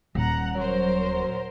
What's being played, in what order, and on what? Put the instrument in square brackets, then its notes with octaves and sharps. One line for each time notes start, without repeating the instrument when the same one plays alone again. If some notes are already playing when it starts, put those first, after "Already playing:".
[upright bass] D#1 [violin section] F#5 A#5
[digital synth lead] F#3 [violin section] A#4 C5 [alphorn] C#5